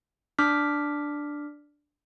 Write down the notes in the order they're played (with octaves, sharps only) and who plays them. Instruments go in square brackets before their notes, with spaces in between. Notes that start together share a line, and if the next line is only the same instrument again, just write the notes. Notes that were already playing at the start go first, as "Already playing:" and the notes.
[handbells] D4 D6 F6 B6